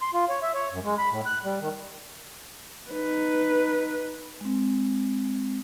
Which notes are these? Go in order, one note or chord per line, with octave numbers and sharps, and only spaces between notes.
C6
F4
C#5
E5
C#5
F#2
G#3
B5
A2
F#6
G3
D#3
D#4 B4
G#3 C4